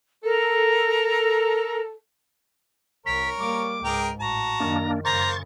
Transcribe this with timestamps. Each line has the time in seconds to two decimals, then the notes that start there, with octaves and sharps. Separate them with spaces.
0.24 A4 A#4
3.06 C2 A#4 C#5 B6
3.39 G3 A#3 D6
3.84 C#2 G#2 G#4 A#4 G5
4.20 A1 F#4 A5 A#5
4.60 F#2 D#3 A#3 D4
5.05 F#2 C#3 A#3 C5 A#5 C#6 A6